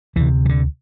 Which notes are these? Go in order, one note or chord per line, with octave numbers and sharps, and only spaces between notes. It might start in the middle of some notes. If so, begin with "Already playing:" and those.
D2 C3 E3
E3
D3